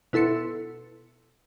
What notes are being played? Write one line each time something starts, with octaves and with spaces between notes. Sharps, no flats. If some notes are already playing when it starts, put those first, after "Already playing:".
B2 E4 A4 C6 C#7